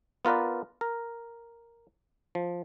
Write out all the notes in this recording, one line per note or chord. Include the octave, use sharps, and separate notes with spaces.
B3 F4 A#4 B4 D5
A#4
F3